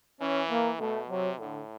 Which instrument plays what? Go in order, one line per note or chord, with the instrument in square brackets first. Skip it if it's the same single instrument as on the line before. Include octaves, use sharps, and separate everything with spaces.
[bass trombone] E3 [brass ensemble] C#4
[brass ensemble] A#3
[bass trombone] B2 [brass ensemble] A3
[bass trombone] C3 [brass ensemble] F#3
[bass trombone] A2 [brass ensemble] D3